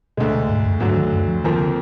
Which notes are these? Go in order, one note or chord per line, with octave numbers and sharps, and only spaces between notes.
D2 B2 D3 G#3
B2
G#2
F#2
D2 G#2 D3 F#3
D#3
F#2
F3
F2 D#3 F3 A#3
D3